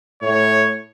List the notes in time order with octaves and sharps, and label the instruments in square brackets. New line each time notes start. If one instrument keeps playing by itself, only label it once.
[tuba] A2 [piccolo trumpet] C#5